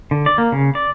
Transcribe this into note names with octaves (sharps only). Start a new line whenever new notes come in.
D3
D5
A#3
C#3
D5